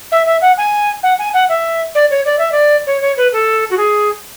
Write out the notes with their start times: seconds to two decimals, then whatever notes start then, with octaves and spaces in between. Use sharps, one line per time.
0.12 E5
0.26 E5
0.42 F#5
0.58 G#5
1.03 F#5
1.19 G#5
1.34 F#5
1.49 E5
1.95 D5
2.11 C#5
2.25 D5
2.39 E5
2.52 D5
2.87 C#5
3.01 C#5
3.17 B4
3.32 A4
3.70 F#4
3.77 G#4